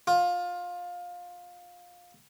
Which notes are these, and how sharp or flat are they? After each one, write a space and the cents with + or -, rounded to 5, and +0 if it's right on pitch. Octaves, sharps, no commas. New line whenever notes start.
F4 +20